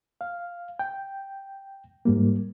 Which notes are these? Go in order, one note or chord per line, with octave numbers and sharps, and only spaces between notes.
F5
G5
G#2 G3 A#3